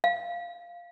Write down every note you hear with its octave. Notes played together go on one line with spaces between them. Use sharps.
F5